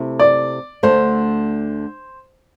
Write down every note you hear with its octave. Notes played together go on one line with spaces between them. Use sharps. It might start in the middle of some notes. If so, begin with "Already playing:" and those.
Already playing: C3 A3 E4
D5
D2 D3 A3 C5